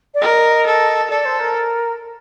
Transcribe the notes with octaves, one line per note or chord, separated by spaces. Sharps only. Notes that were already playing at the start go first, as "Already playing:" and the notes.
D5
A#4 D#5
A4
A4 D5
C5
A#4